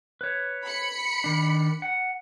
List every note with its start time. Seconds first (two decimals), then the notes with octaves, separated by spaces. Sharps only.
0.21 B4 C#5
0.65 B5 C#7
1.24 D#3 D4
1.82 F#5